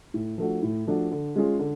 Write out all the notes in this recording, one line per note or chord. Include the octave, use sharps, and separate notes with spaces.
A2
F3 A3 D4 F#4
A2
F3 A3 D4 F#4
D3
G#3 C#4 F4 G#4
D3